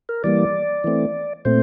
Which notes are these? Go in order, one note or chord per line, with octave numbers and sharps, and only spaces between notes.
A#4
E3 G3 A#3 D5
E3 A3 C4
A#2 A3 C4 C5